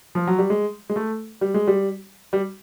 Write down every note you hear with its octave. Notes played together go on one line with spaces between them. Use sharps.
F3
F#3
G3
G#3
G#3
A3
G3
G#3
G3
G3